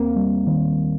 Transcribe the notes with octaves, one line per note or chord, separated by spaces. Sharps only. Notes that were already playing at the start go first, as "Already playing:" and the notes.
Already playing: D#2 A#3 C4
G3
D#3